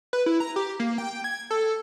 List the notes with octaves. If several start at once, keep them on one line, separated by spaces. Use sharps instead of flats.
B4
E4
A#5
G4
A#3
G5
G#6
A4